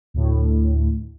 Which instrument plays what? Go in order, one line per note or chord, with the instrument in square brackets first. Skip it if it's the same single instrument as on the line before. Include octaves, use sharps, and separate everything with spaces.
[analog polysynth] D2 A2